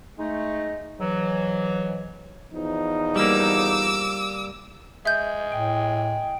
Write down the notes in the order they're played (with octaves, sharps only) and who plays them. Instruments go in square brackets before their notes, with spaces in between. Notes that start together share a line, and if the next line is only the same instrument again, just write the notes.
[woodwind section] G#3 A3 D#4
G#2 E3 F#3
[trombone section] E2 F3 D#4
[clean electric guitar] G3 A#3 [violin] D6 E6
[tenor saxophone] G#3 [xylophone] E5 G6
[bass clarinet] A2 [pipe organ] G5